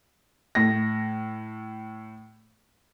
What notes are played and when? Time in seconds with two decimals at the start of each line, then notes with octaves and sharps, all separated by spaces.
0.55 A2 A#6